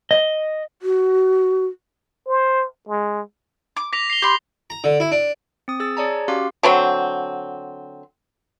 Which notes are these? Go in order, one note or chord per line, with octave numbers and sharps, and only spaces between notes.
D#5
F#4
C5
G#3
D6
D6 A#6 B6 F7
C7 F7 G7
G4 B5 C6
A#5
D3
E4
D4
C4 D#6
G#4 E6 A6
G#4 C#5 D5 A5 A#5
C#4 F#4 G4 F5 C6 D6
D3 F#3 C4